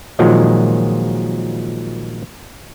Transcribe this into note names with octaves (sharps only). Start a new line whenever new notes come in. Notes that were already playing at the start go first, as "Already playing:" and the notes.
A#2 D#3 F3 F#3 G#3